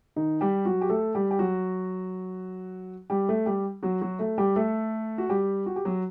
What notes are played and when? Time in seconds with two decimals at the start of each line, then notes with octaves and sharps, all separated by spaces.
0.16 D#3 D#4
0.41 G3 G4
0.65 F#3 F#4
0.81 G4
0.90 A3 A4
1.15 G3 G4
1.31 G4
1.39 F#3 F#4
3.10 G3 G4
3.29 A3 A4
3.46 G3 G4
3.83 F#3 F#4
4.01 F#3 F#4
4.19 A3 A4
4.38 G3 G4
4.56 A3 A4
5.18 F#4
5.30 G3 G4
5.66 F#4
5.76 G4
5.85 F#3 F#4